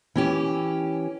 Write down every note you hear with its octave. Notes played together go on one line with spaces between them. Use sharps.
E3 C#4 G4